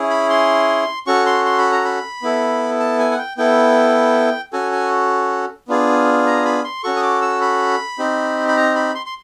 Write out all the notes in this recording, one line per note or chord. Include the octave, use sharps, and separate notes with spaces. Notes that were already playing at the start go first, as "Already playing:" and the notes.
Already playing: C#4 E4 G#4
B5
C6
C#4 F#4 A4 C#6
C6
C6
B5
A#5
B5
B3 E4 A4
A5
G#5
F#5
G5
B3 E4 A4 G5
C#4 F#4 A4 G#5
G#5
B3 D4 F4 G#4
A#5
B5
C6
C#4 F#4 A4 C#6
D#6
D6
E6
B5
C4 D#4 G4
B5
A#5
B5
C6
C6